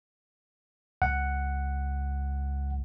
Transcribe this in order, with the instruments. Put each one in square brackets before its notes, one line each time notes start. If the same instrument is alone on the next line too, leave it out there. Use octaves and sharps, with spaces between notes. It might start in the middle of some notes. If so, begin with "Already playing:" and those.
[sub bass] C#2 [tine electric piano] F#5